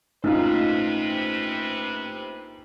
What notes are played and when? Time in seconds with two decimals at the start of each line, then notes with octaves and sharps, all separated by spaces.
0.24 A#1 G#2 C3 A3 C#4 D#4 F4 B4